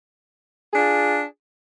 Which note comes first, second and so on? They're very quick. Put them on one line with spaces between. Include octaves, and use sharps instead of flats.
G#4 D4 F4